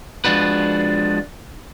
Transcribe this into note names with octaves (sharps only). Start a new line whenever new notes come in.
F3 G#3 D4 F#4 B4